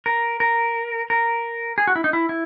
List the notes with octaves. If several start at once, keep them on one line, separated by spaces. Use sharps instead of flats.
A#4
A#4
A#4
G#4
F#4
E4
D#4
E4
E4